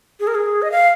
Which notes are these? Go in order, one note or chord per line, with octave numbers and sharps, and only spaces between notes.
G#4
A#4
G#4
D#5
F5